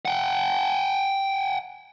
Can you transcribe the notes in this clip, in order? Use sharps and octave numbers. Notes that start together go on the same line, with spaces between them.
F#5 G5